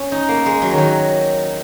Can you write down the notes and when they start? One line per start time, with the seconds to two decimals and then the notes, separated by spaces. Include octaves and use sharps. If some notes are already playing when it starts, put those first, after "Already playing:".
Already playing: C#4
0.12 D#4
0.29 A#3
0.46 G#3
0.62 F#3
0.71 D#3
0.78 F#3